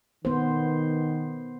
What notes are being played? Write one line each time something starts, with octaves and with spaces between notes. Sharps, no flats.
D#3 B3 C5